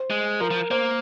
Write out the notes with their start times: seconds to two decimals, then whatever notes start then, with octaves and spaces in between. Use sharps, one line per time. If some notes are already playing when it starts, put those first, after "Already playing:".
Already playing: C5
0.10 G#3
0.40 F3 A#4
0.51 F3
0.71 A#3 C5